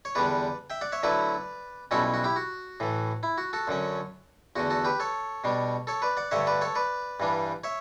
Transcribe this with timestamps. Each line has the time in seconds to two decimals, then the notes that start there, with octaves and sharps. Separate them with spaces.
0.05 C#5
0.15 E2 D3 G3 D4 B4 D5
0.70 E5 G5
0.81 D5 F#5
0.92 C#5 E5
1.03 D2 D3 F#3 A3 E4 B4 D5
1.91 B1 B2 G3 C#4 E4 F#4 A4
2.14 F#4
2.24 E4 G4
2.36 F#4
2.80 A2 E3 A3
3.23 E4
3.38 F#4
3.53 F#4 A4
3.67 F#2 D3 F#3 C#4
4.56 E2 D3 A3 F#4
4.70 F#4 A4
4.85 G4 B4
5.00 A4 C#5
5.44 B2 G3 D4
5.87 A4 C#5
6.02 B4 D5
6.17 D5 F#5
6.31 G2 D3 A3 C#5 E5
6.47 B4 D5
6.61 A4 C#5
6.75 B4 D5
7.20 G2 E3 G3 D4
7.64 C#5 E5